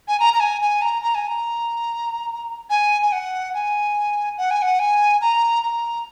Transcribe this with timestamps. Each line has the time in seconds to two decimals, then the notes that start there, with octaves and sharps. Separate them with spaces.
0.08 G#5
0.20 A#5
0.34 A#5
0.40 G#5
0.61 G#5
0.82 A#5
1.02 A#5
1.15 G#5
1.28 A#5
2.70 G#5
3.02 G#5
3.12 F#5
3.54 G#5
4.38 F#5
4.51 G#5
4.62 F#5
4.79 G#5
5.21 A#5
5.63 A#5